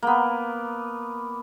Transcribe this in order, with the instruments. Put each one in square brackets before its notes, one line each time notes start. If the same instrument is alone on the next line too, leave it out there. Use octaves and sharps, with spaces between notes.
[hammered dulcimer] A#3 B3